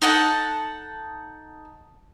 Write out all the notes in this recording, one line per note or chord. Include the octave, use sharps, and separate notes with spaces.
D#4 A4 F#5 A5